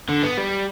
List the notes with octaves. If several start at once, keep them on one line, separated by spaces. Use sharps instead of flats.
D3
B3
G3